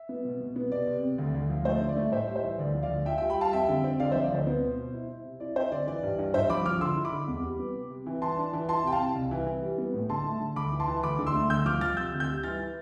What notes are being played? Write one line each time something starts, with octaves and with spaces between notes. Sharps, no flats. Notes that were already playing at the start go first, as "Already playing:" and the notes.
Already playing: E5
B3
B2
B2
B3
C3 D5
C3
C3
D2
D2
F3
A3 C5
D3
D5
A3
A2 C5 E5
G3
C5 E5
E3
D2 D5
F3
D5 F5
D2
F4 E5 G5
E5 G5
G3
G5 B5
G3 F5 A5
F2 E5 G5
D3
C4
D3 D5 F5
F3 C5 E5
D5
D2 C5
B3
B2
B2
E4
E4
C3
E4 D5
C4 C5 E5
D3 D5
E3 D5
G2
G2
G2 C5 E5
F3 B5 D6
F3 D6 F6
D3 C6 E6
E4
B5 D6
D3
E2
G3
B3
C3
C3
E3
E3 A5 C6
D4
E3
E4 A5 C6
C3 G5
F5 A5
C3
C2
E3
E3
G3
B3
A2
D3 A5 C6
A3
D3
D2 B5 D6
E3
A5 C6
E3
D2 B5 D6
D3
C6 E6
A3
D2 E6 G6
F3 D6 F6
F3 F6 A6
C3 E6 G6
D2
E6 G6
G3
E3 F6 A6
E3